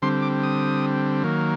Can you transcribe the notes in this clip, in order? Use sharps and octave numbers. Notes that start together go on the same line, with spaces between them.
D3 G3 C4 C6
D6
D#6
D#3 F#3 A#3